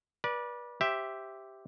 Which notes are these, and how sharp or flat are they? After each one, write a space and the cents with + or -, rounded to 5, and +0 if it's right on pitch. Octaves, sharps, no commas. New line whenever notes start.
B4 -35 D5 +0
G4 +0 C5 +0 E5 +0